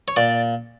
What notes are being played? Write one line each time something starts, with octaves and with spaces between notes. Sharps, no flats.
C#5
A#2 D5